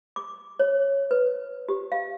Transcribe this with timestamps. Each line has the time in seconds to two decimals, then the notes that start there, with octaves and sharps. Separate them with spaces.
0.16 D6
0.59 C#5
1.11 B4
1.69 G4
1.92 F5